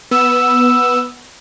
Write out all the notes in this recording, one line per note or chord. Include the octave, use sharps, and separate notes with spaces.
B3 E6